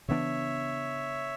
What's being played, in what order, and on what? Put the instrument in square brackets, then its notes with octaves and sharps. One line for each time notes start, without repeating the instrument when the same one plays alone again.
[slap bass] C#3 E3 B3 D4 [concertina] C#5 E5